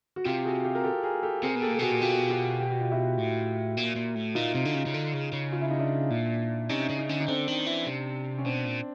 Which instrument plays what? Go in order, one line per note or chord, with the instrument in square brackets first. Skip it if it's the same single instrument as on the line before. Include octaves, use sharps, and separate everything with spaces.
[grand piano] F#4
[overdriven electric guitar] C3 [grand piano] F4 G4
[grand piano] F#4 G#4
F4 G4
A#4
G4 A4
G#4 A#4
G4 A4
[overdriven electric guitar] C3 [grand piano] G#4 A#4
[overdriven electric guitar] B2
[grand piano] G4 A4
[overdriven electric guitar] A#2
[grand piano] A4
[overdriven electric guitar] B2 [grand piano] F#4 G#4
[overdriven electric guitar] A#2
[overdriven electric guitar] B2 [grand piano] F4 G4
[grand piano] F4 G4
G4
F#4
F4
E4 F#4
[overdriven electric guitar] A2
A#2
A#2
A2
[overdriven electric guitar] A#2 [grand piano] D#4 F4
[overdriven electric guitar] C3
D3
C#3
C#3
D3
C#3
C#3
[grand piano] F4
E4
D#4
D4 E4
[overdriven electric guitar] A#2
[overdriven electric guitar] C3 [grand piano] C#4 D#4
[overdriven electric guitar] C#3
[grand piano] C#4 D#4
[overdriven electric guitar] D3
[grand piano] D#4
[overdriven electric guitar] D3 [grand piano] C4 D4
[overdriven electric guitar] D#3
E3
C3
[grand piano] C#4
[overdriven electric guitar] B2 [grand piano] C4 D4
[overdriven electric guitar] A#2